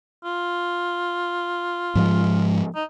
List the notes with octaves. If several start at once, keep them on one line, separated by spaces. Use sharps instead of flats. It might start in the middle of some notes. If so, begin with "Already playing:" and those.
F4
G#2 F3 G#3
D#4